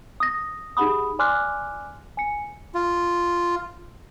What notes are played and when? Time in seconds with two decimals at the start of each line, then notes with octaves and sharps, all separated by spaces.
0.20 D#6 A#6
0.77 D#4 G4 G#4 F#5 B5 D#6
1.19 D5 G#5 C6 D6 F6 F#6
2.17 G#5 C#7
2.75 F4